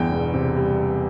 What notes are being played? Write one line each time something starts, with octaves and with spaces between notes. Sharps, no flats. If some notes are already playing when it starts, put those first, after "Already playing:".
Already playing: G1 E2 G5
E1
C3
G3